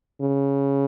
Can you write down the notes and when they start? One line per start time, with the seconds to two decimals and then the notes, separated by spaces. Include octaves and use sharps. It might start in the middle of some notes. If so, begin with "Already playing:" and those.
0.21 C#3